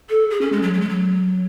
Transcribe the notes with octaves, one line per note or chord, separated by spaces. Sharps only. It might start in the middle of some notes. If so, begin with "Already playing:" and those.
A4
G#4
C#4
G#3
F#3
F#3
G#3
F#3